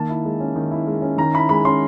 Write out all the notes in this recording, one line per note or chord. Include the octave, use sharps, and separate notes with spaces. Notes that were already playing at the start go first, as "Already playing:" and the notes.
Already playing: D#3 A#3 A5
E4
G#3
C#4
D#3
E4
G#3
C#4
D#3 A#5
E4 B5
G#3 B5
C#4 C6